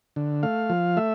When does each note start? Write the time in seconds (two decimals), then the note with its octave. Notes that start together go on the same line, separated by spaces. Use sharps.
0.16 D3
0.43 A3 F5
0.70 F3
0.97 A3 E5